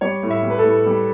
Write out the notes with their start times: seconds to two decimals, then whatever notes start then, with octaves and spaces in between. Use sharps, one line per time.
0.01 G3 C#5
0.23 A2
0.30 E5
0.43 G3
0.50 B4
0.58 A4
0.64 A2
0.86 G3